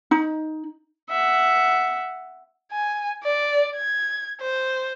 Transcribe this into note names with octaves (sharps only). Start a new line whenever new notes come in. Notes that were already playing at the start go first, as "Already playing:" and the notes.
D#4
E5 F#5
G#5
D5
G#6
C5